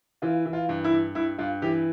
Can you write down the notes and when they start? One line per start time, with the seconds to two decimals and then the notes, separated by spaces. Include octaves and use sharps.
0.22 E3 F4
0.46 E3
0.53 F4
0.69 G2
0.84 E4
0.92 G2
1.15 G2 E4
1.38 G2 F4
1.62 E3 G4